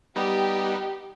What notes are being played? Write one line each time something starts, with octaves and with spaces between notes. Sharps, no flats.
G3 B3 D#4 G4